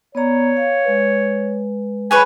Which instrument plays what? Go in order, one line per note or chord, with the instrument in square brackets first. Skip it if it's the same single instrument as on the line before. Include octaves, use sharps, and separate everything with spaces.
[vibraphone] B3 D5 A#5 [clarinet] C#5
[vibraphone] F5
G#3 B4
[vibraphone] G#4 [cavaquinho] B4 C#5 F#5 [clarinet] G#5